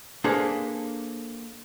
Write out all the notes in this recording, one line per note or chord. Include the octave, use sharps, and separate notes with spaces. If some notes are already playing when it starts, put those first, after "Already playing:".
A#3 D4 G#4 A4 B4 C5